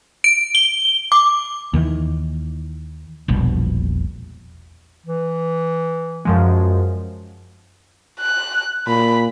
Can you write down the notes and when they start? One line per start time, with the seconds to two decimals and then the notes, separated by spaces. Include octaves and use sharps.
0.24 D7
0.55 G7
1.12 D6
1.74 D#2 D#3 E3
3.28 E1 A#1 B2 G3
5.06 E3
6.25 F#2 F3 G#3
8.20 F#6
8.87 A#2 B5